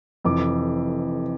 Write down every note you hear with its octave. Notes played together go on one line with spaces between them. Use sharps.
F1 F2 E3 D6